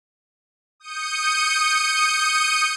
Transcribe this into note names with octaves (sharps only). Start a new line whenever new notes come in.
D#6 G6 C#7 D#7